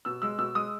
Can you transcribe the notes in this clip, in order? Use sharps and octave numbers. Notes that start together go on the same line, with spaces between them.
B2 E6
G#3 E6
B2 E6
G#3 D#6